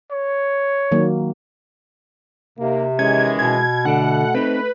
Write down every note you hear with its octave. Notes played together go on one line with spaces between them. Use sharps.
C#5
D#3 F#3 A#3
D#2 C3 A#3
D#3 E3 G#3 C#4 G#6
B2 G#6
D3 A3 D4 F#5
C4 D#4 B4